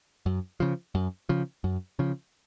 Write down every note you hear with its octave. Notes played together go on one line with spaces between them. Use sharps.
F#2
C#3 F3
F#2
C#3 F3
F#2
C#3 F3